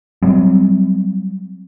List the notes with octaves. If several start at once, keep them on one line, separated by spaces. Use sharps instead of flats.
F#3 G3 C4